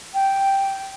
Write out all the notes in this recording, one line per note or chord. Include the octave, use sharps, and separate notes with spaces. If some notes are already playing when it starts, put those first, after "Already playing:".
G5